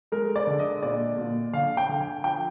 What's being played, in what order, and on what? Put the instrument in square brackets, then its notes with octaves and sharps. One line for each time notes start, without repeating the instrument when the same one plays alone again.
[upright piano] G#3 A#4
D5
D3
D#5
A#2 D5
A#2
D3 F5
G5
D3
G#5
F3 G5